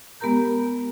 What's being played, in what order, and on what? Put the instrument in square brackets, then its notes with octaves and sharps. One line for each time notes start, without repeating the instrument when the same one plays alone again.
[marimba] G#3 B3 G4 A#4 A#5 G6